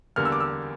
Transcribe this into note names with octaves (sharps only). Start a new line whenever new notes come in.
E2 D3 G3 A#3 F6
E6
D6
E6